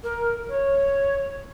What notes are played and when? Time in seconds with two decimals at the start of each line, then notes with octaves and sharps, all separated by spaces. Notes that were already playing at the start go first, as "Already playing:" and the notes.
0.04 A#4
0.49 C#5